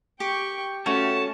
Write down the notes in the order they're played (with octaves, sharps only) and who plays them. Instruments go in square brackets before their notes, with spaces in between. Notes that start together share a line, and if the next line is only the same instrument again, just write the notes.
[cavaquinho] G4 [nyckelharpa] G5 C#6
[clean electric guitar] A3 F#4 [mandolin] C#4 [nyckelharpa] A5